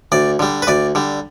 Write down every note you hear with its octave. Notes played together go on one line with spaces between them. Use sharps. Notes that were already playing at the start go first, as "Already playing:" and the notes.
D2 D5
D3 G3
B4
D2 D5
D3 G3